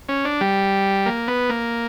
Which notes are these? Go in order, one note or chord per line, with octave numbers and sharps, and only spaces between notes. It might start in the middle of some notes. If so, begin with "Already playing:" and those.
C#4
D4
G3
A#3
B3
A#3